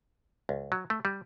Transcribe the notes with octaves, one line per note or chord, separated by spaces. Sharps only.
C#2
F#3
A3
G3